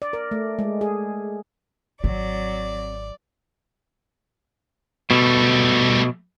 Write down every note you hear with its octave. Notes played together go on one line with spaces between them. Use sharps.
D5
A#4
A3
G#3
G#4
G#1 F#3 C4 D5
B2 G3 A3